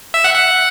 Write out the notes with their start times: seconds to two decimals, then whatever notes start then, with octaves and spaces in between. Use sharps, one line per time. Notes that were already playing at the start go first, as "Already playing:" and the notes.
0.14 E5
0.24 F#5
0.35 F#5